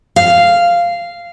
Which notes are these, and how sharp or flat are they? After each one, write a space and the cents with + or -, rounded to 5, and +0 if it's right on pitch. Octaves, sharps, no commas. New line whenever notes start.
F5 -10